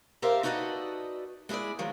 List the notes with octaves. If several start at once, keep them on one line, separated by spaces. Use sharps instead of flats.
G4 A4 A#4 C5 E5 F5
D#4 F#4 A4 B4 D5 D#5
G#3 E4 G#4 B4 D5
D#3 F3 F#3 G#3